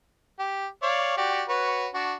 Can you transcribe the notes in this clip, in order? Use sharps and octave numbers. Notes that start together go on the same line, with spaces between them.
G4
C#5 D5 F5
F#4 G4 D5
F#4 B4 C#5
D4 F#4